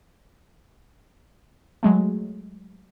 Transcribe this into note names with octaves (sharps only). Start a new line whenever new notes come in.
F#3 G#3 A3